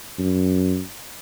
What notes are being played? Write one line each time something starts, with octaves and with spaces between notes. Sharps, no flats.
F#2